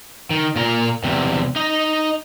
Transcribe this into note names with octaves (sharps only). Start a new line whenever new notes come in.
D#3
A#2 A#4
E2 C3
D#4 D#5